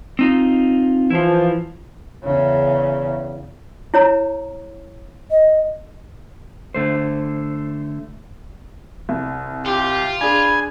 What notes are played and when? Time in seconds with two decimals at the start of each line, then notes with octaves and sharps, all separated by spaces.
0.19 C4 D#4 F4
1.11 E3 F3 E4 F4
2.24 E2 C#3
3.94 E4 C#5 A#5
5.30 D#5
6.75 D3 A3 C5
9.09 C2
9.66 F4 G4
10.21 D4 G#4 G#5 B5